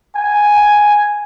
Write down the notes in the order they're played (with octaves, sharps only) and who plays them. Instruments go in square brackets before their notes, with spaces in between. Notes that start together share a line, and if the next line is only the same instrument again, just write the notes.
[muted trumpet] G#5